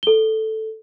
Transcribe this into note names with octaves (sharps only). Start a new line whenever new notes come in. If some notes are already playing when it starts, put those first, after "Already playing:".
A4 G7